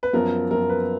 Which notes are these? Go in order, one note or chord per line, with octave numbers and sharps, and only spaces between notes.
B4
F#2 F3 B3 A#4
F#2 F3 B3 A#4
B4